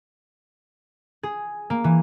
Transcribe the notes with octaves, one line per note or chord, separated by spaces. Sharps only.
G#4
A#3
E3